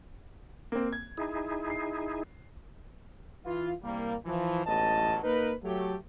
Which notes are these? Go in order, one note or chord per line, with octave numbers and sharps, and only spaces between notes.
A#3 C4
G#6
D#4 E4 G#4
C7
E3 F4
C2 G3 A#3
E3 F3
A1 E2 G#2 F#3 D#5 A5
A#3 D#4 A#4 B4
F#3 A3 G4